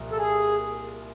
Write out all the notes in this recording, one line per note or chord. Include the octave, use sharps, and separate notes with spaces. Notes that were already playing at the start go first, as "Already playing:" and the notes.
Already playing: C2 A#2 F3 A#3
A4
G#4